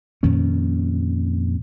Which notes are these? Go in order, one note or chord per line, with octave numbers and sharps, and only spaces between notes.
F2 A#2 D#3 C#4